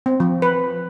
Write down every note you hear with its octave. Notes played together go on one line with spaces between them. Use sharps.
C4
F3
B4